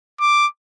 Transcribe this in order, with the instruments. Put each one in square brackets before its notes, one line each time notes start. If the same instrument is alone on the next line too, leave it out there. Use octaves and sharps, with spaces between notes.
[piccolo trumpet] D6